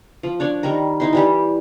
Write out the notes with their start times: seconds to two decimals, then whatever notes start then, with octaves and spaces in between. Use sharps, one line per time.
0.23 F3
0.40 D4 C#5 D5
0.63 D#3 G3 A#4
1.00 D#4 E4 C6
1.13 E3 G3 G4